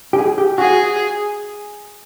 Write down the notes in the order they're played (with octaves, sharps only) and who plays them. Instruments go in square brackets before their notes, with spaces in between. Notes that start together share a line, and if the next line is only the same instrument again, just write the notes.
[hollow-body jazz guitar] G4
G#4
G4
[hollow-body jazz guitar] F#4 [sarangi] G#4